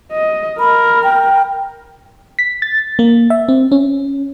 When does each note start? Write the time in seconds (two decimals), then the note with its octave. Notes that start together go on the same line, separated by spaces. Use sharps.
0.12 D#5
0.59 A#4 B5
1.03 G5
2.39 B6
2.62 A6
2.99 A#3
3.30 E5
3.49 C4
3.72 C#4